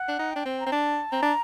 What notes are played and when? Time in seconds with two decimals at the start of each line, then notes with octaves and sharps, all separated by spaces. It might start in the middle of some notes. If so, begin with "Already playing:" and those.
Already playing: F#5
0.08 D4
0.19 D#4
0.31 D4 G5
0.45 C4
0.60 A#5
0.66 C4
0.72 D4 A5
1.12 C4 A#5
1.22 D4